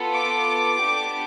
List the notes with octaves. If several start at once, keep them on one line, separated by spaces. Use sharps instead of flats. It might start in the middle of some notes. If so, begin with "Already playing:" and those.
Already playing: B3 F4 A4
D6
B3 D4 G4